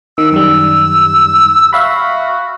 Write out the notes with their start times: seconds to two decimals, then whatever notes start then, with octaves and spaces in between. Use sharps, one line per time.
0.18 D#3 E6
0.32 F#2 D#3 G3 E6
1.73 F#4 E5 F5 B5